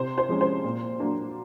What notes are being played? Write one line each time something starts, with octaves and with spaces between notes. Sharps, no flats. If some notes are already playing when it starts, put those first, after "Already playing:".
Already playing: C3 C5
C5
F3 G#3 C#4
C5
A#2
F#3 A#3 D4